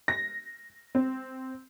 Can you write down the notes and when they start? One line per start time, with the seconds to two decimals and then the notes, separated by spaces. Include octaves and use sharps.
0.08 A#6
0.95 C4